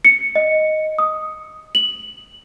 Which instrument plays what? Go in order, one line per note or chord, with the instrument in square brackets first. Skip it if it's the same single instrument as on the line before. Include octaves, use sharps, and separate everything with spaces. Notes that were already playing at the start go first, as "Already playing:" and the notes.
[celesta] C#7
D#5
D#6
F#7